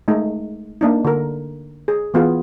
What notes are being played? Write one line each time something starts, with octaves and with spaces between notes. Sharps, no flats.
G#3 A3 D#4
A#3 D4 D#4
D3 A#4
G#4
E3 B3 F4 G#4